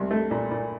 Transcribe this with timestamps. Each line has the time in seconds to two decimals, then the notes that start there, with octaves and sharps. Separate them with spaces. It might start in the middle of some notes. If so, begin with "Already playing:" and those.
Already playing: C2
0.11 A3
0.31 A#2
0.51 A#2